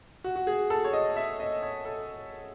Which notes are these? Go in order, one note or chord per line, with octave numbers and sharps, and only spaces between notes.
F#4
F#4
G#4
A4
C#5
D#5
E5
D#5
C#5
A4